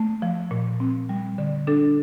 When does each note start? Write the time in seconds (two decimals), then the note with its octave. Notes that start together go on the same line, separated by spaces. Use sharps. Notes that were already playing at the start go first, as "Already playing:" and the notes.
Already playing: A3
0.22 F3
0.51 A#2
0.80 C4
1.09 G3
1.38 D3
1.67 D4 A4